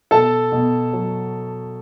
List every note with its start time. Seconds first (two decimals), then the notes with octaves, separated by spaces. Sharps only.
0.11 B2 A4 A5
0.52 B2
0.93 F#3